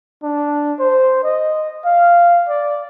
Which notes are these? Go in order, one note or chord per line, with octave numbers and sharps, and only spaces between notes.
D4
C5
D#5
F5
D5